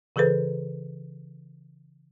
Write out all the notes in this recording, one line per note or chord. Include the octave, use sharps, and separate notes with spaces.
C#3 E3 G#4 A4 B4 C5